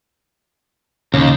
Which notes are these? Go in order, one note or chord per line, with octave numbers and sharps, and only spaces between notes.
D#2 C#3 D#4